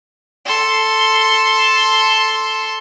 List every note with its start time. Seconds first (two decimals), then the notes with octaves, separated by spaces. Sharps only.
0.46 A4 C6